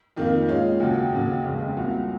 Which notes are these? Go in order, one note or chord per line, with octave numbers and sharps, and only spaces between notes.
F2 D#3 A#3 F4
A#2 G#3 C#4 F4
D#2 C#3 F#3
D#2 C#3 F#3
F1 D#2 C#3 G#3
C2 A#2 F#3